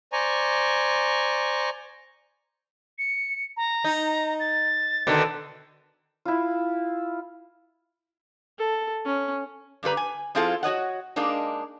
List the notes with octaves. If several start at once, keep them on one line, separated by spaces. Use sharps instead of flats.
C5 D5 G#5 A#5 C#6
C#7
A#5
D#4
A6
B2 D3 D#3
E4 F4
A4
C#4
G2 D3 G3 B4 A#5
G#5
F3 C4 E4 F4 G#4 A4
F#4 C#5 D#5 F#5
G#3 A#3 D4 D#4